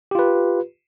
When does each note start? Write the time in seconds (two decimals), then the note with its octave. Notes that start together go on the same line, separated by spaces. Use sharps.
0.11 G4
0.15 F4
0.19 B4